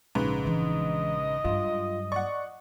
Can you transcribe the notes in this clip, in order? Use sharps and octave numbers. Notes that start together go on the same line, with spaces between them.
A#1 G#2 C#3 B4
E3 D4 D#5
G2 F#3 F4
D5 F#5 C#6